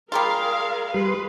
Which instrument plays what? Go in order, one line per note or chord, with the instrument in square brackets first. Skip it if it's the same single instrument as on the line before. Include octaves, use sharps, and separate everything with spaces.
[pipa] G3 A#3 F4 [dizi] G#4 [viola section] A#4 F5
[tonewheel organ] G3 C6 [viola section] B4